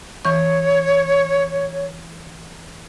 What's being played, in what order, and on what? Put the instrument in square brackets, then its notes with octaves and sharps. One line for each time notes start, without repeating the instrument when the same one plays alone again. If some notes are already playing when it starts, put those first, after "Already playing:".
[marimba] E3 C#6 [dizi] C#5